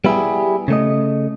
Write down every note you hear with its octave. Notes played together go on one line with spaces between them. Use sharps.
G3 B3 E4 F4 G4 G#4
C#3 A3 D#5